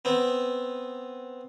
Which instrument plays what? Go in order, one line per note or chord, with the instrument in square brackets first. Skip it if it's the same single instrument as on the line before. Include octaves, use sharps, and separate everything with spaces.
[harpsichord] B3 C4